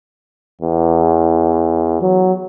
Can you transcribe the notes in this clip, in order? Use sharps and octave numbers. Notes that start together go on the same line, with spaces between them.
E2
F#3